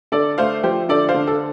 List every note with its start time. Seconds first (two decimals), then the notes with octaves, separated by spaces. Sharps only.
0.12 D3 A4 D5
0.38 A3 C5 F5
0.63 F3 G4 C5
0.89 D3 A4 D5
1.09 C5 F5
1.14 D3
1.27 A4